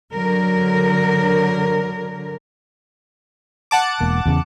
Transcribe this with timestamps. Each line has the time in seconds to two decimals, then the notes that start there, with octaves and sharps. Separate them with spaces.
0.13 D3 F#3 A#4
3.71 F#5 A5 D6
4.01 E1 A#3
4.26 E2 C#3